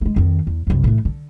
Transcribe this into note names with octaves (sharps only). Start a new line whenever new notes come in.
G#3 A3
F2 D#3
E2
C2 F#2
A2 E3
D3